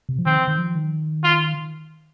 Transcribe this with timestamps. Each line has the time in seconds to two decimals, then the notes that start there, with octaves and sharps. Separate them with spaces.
0.09 C3
0.19 F3
0.26 D#3 C4
0.48 D#3
0.58 F3
0.75 D#3
1.24 F4